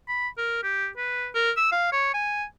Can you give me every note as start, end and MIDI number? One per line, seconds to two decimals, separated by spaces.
0.08 0.28 83
0.38 0.62 70
0.63 0.88 67
0.97 1.28 71
1.35 1.51 70
1.57 1.71 88
1.72 1.91 77
1.92 2.13 73
2.14 2.44 80